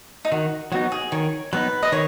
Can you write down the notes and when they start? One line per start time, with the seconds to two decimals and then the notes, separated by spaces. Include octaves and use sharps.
0.25 D#4
0.32 D#3 F#4
0.72 F#3 B3 D#4 F#4
0.92 G#4
1.12 D#3 C#5
1.53 F#3 B3 D#4 B4
1.83 D#5
1.92 D#3 C#5